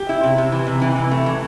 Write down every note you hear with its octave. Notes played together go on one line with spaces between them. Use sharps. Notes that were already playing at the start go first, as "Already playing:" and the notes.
Already playing: G4
E4
C3
C3
E3
C3
E3
C3
A3
E3